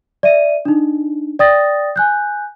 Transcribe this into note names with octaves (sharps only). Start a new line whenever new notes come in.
D5 E5 D#7
D4 D#4
D5 G5 D#6 A6 A#6
G#5 F#6 G6